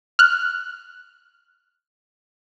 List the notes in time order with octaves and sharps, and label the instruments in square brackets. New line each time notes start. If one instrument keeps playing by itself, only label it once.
[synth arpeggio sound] F6 F#6